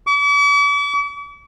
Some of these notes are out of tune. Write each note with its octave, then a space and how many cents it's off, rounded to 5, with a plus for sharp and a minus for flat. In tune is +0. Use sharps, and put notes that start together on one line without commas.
D6 -45